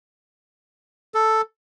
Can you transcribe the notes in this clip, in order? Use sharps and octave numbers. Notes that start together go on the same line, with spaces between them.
A4